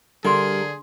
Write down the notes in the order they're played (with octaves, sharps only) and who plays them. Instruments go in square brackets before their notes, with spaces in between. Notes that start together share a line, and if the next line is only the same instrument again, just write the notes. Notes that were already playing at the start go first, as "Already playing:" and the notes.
[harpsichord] D3 [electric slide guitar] G3 A#4 [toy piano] D4 C6 [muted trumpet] G#4